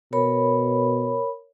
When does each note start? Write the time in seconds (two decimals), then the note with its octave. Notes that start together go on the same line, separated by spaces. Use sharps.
0.13 B2 A#4 C#5 B5